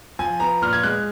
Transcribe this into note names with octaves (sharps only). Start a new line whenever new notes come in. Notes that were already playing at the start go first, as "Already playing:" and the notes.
F3 G#5
B3 A#5
A#2 F6
G#6
G#3 F#6